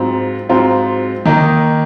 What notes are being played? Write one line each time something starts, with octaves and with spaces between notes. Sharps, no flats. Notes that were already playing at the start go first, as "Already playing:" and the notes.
Already playing: G#2 F#3 C4 F4
G#2 F#3 C4 F4
D#3 A#3 D#4